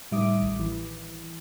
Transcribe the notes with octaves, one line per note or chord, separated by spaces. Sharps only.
A2 D#3 G3 E5 D6 D#6
A1
E3